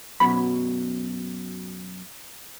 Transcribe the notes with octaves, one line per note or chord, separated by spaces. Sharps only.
F#2 B2 F#3 B5